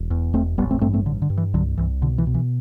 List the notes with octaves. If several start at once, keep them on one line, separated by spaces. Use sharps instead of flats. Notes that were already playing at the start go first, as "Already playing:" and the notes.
Already playing: E1
E2
E1 A3 C4
A1 G3 B3
A3 C4
G2 A3 C4
A3 C4
G2 D3
D3
G2
E3
C2 D3 F#3
C2 E3
B2 D3
E3
B2
E3